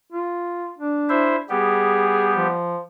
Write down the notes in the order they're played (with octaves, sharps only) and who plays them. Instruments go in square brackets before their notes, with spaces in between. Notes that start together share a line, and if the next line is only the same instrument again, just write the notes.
[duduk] F4
D4
[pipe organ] E4 C5 E5
[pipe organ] G3 B3 G4 [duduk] G#4
[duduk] F3